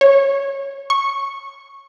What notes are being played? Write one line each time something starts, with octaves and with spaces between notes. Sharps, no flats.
C#5
C#6